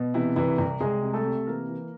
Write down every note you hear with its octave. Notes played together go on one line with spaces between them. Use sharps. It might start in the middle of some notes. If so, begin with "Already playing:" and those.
Already playing: B2
C3 E3 E4
C2 E3 E4
C2
C2 G#3 G#4
C3
A3 A4
C3
E3 A#3 A#4
E3